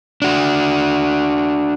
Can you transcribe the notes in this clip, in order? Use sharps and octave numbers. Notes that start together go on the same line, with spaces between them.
D4 F#4